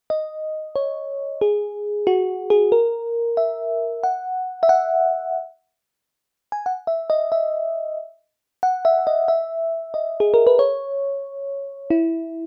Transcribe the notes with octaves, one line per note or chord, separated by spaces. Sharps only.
D#5
C#5
G#4
F#4
G#4
A#4
E5
F#5
E5
F#5
G#5
F#5
E5
D#5
E5
F#5
E5
D#5
E5
D#5
G#4
A#4
B4
C#5
E4